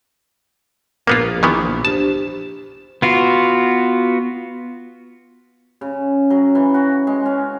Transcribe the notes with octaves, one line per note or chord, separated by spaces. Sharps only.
A#1 A#3 B3 F4
D#3 E3 B3
D4 G4 C5 A5
B3 F4 F#4
C#3
F#3
E3
F#4
G#3
C#4